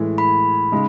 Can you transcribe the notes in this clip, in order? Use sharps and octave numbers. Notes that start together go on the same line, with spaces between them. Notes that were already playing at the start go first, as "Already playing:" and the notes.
Already playing: A2 E3 G#3
B5
C#3 G#3 D#4